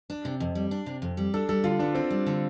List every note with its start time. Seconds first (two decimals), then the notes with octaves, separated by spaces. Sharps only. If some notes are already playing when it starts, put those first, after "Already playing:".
0.10 D4
0.25 C3
0.40 F2
0.55 G3
0.71 D4
0.86 C3
1.02 F2
1.17 G3
1.34 D4 A4
1.49 G3 A4
1.64 D3 F4
1.79 B3 D4
1.95 C4 D4
2.10 G3
2.26 D3